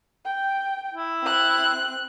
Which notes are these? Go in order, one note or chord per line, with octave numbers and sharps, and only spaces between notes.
G5
E4
C4 F#6